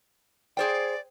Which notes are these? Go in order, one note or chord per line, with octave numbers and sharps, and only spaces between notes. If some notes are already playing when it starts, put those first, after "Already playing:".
G#4 C5 D5 G5